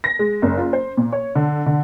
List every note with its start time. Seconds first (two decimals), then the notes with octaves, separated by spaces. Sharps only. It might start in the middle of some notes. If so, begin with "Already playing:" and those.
0.04 A#6
0.19 G#3
0.42 F#1
0.57 F4
0.73 C5
0.97 A#2
1.12 C#5
1.35 D3
1.66 D3